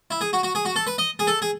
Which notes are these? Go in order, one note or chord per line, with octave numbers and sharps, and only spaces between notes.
E4
G#4
F#4
F#4
G#4
F#4
A4
B4
D#5
G#4
A4
G#4